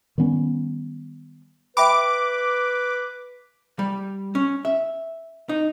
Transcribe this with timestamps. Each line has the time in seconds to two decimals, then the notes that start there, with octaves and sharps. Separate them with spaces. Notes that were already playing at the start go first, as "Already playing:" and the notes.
0.18 D#3 G3 B3 C#4
1.77 B4 E5 G5 B5 D6
3.79 G3
4.35 C#4
4.65 E5
5.49 D#4